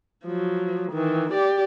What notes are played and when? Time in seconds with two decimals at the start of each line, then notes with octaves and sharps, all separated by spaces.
0.25 F3 F#3
0.92 D#3 E3
1.32 G4 D5